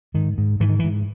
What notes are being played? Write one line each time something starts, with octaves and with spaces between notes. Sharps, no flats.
G#2 D#3
G#2
G#2 E3
D#3
E3
G#2